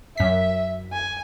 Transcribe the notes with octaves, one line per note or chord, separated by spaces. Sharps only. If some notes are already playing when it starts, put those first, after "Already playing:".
F#2 E5 B6
G#5